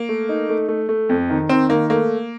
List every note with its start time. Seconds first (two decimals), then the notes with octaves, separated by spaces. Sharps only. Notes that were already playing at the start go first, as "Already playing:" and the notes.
Already playing: A#3
0.09 A3
0.29 D#4
0.49 A3
0.69 A3
0.89 A3
1.09 F2
1.30 D#3
1.49 D#3 C4
1.69 D#3 A#3
1.90 A3 A#3